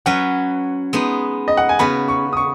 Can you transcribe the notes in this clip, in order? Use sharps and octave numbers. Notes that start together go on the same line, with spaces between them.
F#3 C#4 B4 F#5
G#3 B3 D#4
D#5
F#5
G#5
C#3 B3 F#4 B5
C#6
D#6
C#6